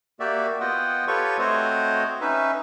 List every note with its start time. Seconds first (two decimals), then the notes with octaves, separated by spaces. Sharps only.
0.20 A#3 F#4 G4 D5 E5
0.60 B3 F4 D#5 F#5 G5
1.08 F4 G4 A4 B4 C#5 C#6
1.39 A3 C4 F#4 C5 C#5 D#5
2.21 C#4 D#4 B4 E5